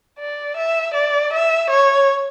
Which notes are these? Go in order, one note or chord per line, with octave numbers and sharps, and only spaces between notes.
D5
E5
D5
E5
C#5